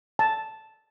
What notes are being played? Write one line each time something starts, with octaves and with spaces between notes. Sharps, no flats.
A5